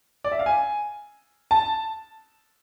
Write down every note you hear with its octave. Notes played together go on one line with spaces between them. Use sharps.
D5
E5
F5
G#5
A5